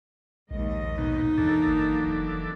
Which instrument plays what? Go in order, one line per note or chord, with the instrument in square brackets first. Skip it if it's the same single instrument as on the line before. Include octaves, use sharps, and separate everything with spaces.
[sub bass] A#1 [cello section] D#2 G#2 D#5
[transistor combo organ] B2 [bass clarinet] D#4
[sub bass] E2 [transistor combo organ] E3 D4 A4 [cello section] F#3 A#3
[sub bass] G1
F1